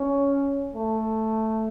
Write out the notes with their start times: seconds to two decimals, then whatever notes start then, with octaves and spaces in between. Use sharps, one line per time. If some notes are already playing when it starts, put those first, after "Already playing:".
Already playing: C#4
0.75 A3